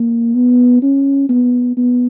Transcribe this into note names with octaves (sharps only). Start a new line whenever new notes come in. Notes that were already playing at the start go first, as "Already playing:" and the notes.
Already playing: A#3
B3
C#4
B3
B3